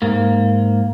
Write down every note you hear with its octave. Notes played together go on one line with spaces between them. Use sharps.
G#2 A#3